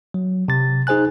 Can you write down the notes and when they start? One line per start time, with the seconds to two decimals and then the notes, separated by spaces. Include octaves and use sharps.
0.14 F#3
0.48 C3 A6
0.87 D#4 G#4 C5 G#5 F#6